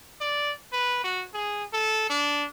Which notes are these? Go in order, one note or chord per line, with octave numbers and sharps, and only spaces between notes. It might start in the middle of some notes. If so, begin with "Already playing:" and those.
D5
B4
F#4
G#4
A4
D4